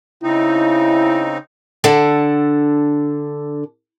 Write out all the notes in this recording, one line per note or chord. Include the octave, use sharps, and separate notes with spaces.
C#3 C4 D#4 E4
D3 D4 A4 F#5